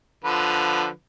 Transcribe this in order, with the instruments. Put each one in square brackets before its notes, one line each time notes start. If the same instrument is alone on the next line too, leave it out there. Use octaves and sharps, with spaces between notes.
[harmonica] D3 F3 B4